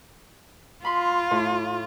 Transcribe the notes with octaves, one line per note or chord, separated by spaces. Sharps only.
F4 B5 C6
A2